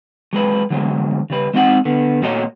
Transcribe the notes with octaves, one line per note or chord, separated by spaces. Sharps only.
F#3 G#3 B4
D3 F#3 G#3
C#3 G3 B4
G#3 C4 D#4 F#4 B4 F#5
D3 B3
A#2 A3 F#4 C#5 D#5 A#5